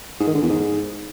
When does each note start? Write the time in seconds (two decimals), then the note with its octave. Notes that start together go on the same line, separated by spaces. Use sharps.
0.20 G#2
0.27 D#3
0.35 D3
0.42 E2
0.50 G#2